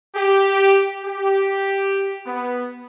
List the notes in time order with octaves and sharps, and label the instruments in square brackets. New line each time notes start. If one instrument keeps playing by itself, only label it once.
[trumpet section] G4
G4
B3